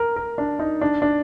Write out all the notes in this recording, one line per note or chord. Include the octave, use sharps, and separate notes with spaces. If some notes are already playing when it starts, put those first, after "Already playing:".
Already playing: A#4
A#4
D4
D#4
D4
D4